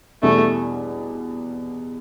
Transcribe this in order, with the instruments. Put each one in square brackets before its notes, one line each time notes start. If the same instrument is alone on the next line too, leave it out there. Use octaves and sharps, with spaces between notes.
[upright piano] E2 B2 G3 [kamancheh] A3